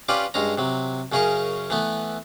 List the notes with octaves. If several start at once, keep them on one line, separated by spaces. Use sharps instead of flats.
C#4 F4 G4 B4 D5
G2 G#3 C#4 A#5
C3 F#3
F#2 C#3 C#4 G#4 A#4 C#6
E3 A3 B3